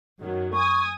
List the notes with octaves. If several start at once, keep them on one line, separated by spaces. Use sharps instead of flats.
F#2 D#3 F#3
G#5 C#6 D#6